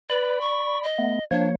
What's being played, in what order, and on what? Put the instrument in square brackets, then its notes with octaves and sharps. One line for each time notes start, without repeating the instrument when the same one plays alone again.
[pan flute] B4 [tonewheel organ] D5 B5
[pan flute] C#6
D#5
[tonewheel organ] A3 B3
[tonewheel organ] F3 A#3 C#5 [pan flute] D4